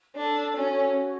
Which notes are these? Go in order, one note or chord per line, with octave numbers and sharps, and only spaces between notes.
D4 A4
C#4 F#4
C#5